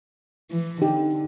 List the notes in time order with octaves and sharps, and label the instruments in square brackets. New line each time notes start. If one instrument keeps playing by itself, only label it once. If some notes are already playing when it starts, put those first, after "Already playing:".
[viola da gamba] E3
[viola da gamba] D3 [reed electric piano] D#4 [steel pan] G4